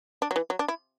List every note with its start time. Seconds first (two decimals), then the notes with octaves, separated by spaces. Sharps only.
0.22 D4
0.31 F#3
0.36 E3
0.50 F#3
0.59 D4
0.68 E4